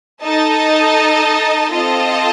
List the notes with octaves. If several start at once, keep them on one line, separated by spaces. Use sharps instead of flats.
D#4 A4 D#5 A5
C4 F4 A4 D#5 A5